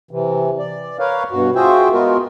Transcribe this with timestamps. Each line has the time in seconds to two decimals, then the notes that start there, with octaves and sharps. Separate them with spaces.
0.11 C3 E3
0.58 D5
0.99 A#4 B4 C#5 F5
1.32 G2 B2 F#4
1.55 F4 F#4 G#4 C5 E5 G5
1.92 G#3 B3 F4 F#4 A#4